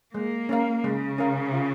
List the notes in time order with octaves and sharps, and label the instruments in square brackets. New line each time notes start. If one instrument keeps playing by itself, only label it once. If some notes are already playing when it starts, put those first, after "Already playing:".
[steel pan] G#3 [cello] A#3
[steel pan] C#4 A#4 F5
[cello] C#3 [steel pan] G#3
[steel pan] C#4 A#4 F5
F4